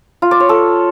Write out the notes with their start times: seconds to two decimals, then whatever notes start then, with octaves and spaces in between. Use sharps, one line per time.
0.22 F4
0.31 D5
0.40 C#5
0.49 A4